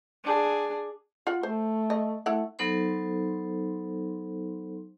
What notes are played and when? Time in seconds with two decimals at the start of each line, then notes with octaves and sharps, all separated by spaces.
0.24 D4 G#4
1.27 F4 F#5
1.43 A3 C5
1.90 D#5
2.26 A3 E4 F#5
2.59 F#3 B3 D#4 A4 C5 C6